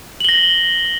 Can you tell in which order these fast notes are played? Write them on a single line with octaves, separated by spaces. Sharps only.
F#7 G7 A#6